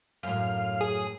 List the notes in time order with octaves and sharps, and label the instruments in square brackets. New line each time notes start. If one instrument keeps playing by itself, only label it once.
[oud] F#2 A2 [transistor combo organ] F5
[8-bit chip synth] G#4